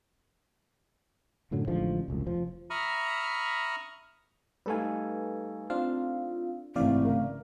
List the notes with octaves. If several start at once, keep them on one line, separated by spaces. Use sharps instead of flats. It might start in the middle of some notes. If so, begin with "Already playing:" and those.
F#2 A2 D3 F#3
A1 D3 F3 G#3
F1 C#2 F#2
F1 F3
E5 A#5 B5 C#6 D#6 F6
G3 A3 D#4 A4 B4 F5 G#5
C4 D4 F4 F5
G#1 C3 E3 A3 D5 F5
C#3 A#4